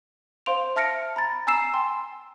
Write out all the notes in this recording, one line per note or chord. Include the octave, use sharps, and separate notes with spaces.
C5 F5 C6 D7 F7
E5 A5 F6 A#6 C#7 D7
A#5 B5 A6
G#5 A#5 E6 C7 E7
G5 G#5 C6